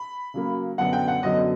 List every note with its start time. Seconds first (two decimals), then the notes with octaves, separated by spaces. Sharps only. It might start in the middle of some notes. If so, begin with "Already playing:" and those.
Already playing: B5
0.34 C#3 F#3 A#3
0.78 F#2 D3 F#3 B3 F#5
0.93 G5
1.08 F#5
1.23 F#2 D3 F#3 B3 D#5